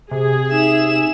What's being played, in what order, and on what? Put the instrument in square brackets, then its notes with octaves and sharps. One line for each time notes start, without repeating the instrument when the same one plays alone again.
[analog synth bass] C3 [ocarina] G4 [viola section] G#4
[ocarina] D#4 [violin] E5 E7